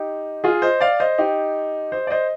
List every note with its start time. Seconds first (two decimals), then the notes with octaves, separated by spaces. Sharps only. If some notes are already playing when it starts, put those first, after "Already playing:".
Already playing: D#4 G4
0.44 F4 G#4
0.62 C5 D#5
0.81 D5 F5
1.00 C5 D#5
1.18 D#4 G4
1.92 C5 D#5
2.07 D5
2.11 C5 D#5